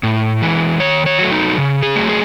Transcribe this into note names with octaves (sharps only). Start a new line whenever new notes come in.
A2
E3 G#3
D#3 C#5
C#5
F#3 A3
D#4
C#3
G#4
F#3 A3
G#4